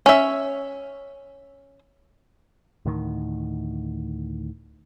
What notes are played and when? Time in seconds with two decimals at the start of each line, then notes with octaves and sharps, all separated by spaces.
0.06 C#4 E5
2.85 D2 A2 D#3